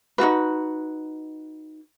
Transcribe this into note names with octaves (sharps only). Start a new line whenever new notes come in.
D#4 F4 F#4 B4